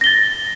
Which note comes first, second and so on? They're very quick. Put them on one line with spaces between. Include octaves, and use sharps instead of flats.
A#6 G7 A6